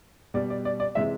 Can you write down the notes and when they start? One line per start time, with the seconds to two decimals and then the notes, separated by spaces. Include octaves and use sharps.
0.34 B2 G3 D5
0.50 D5
0.65 D5
0.80 D5
0.95 C3 E3 G#3 E5